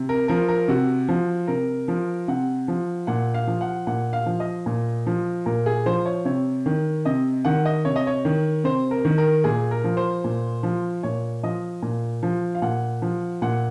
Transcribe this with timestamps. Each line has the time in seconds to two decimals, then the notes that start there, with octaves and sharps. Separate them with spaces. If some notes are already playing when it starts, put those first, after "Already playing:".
Already playing: C3
0.09 A#4
0.28 F3 A#4
0.48 A#4
0.68 C3 F#4
1.09 F3
1.48 C3 A#4
1.88 F3
2.28 C3 F#5
2.68 F3
3.07 A#2 F#5
3.34 F5
3.47 F3
3.61 F#5
3.87 A#2 F#5
4.13 F5
4.26 F3
4.40 D#5
4.66 A#2
5.07 F3
5.46 A#2 A#4
5.66 G#4
5.86 F3 C5
6.06 C#5
6.25 C3 C#5
6.66 D#3
7.05 C3 D#5
7.45 D#3 F#5
7.65 D#5
7.85 C3 C#5
7.96 D#5
8.07 C#5
8.25 D#3
8.64 C3 C5
8.91 A#4
9.05 D#3
9.18 A#4
9.44 A#2 G#4
9.71 A#4
9.84 F3
9.97 C5
10.24 A#2
10.63 F3
11.03 A#2 C#5
11.43 F3 D#5
11.82 A#2
12.23 F3
12.55 F5
12.62 A#2 F#5
13.02 F3
13.42 A#2 F#5